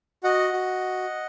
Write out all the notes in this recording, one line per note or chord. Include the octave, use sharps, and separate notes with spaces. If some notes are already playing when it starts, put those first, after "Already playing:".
F#4 D#5 F#5
F#4